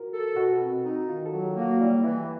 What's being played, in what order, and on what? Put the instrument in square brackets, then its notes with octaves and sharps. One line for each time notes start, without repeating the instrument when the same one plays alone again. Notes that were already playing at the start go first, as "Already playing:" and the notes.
Already playing: [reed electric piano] F4 F#4 A#4
[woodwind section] A4
[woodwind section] B2 [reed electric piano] F#4
[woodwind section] C4
D#4
[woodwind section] D#3 [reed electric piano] F4
[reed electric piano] A4
[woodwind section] F#3
[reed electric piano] G4
[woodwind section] A#3
[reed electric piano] F#4
[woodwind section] G3 [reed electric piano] E4
[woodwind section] E3 [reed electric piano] E4